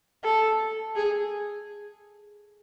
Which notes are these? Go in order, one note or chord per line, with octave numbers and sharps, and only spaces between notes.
A4
G#4